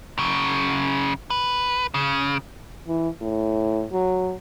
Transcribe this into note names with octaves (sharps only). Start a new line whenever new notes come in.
F#2 C#3
B4
C#3
E3
A2
F#3